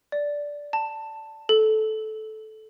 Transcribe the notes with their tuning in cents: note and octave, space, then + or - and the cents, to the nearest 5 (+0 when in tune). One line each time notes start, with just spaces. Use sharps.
D5 -10
A5 +10
A4 -15